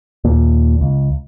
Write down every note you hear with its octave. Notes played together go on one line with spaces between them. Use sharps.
D#2 A#2
C#2